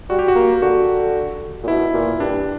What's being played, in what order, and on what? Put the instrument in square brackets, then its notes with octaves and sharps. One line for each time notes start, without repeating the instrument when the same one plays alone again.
[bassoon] G3 [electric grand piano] F#4
[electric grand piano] G4
F#4
[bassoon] A#3
[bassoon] D3 [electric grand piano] F#4
[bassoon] A#2
[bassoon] B2 [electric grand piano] E4
[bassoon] A#2
[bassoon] G2 [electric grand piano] D4